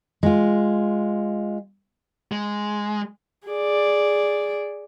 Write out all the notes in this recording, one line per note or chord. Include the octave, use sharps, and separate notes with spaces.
G#3 F4
G#3
G#4 D5